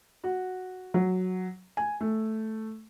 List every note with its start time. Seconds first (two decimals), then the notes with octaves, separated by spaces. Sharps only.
0.24 F#4
0.94 F#3
1.77 G#5
2.01 A3